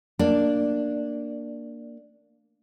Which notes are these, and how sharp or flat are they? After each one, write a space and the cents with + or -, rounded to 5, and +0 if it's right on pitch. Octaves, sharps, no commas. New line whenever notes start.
A#3 +0 D4 +0